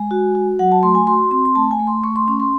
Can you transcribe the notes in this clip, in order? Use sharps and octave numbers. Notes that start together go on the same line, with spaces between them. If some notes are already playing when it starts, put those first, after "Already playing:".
Already playing: G#3 G#5
F#4
F#4
F#3 F#5
A5
A3 C6
G#5
F#4 C6
C4 C6
C6
A3 A5
G#5
A3
C6
A3 C#6
C6
C#4 C#6
C6